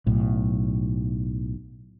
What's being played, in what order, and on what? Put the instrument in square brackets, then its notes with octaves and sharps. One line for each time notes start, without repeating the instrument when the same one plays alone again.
[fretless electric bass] B1 A2